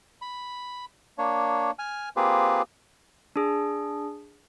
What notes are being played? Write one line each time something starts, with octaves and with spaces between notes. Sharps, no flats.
B5
A#3 D4 C#5
G#5 F6
A#3 C4 F4 G4 G#4 B4
D4 G#4